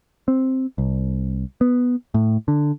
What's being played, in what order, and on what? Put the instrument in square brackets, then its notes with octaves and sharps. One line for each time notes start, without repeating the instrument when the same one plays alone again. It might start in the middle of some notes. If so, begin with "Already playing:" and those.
[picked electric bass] C4
C2
B3
A2
D3